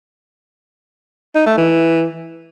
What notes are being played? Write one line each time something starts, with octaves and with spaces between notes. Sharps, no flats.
D#4
A3
E3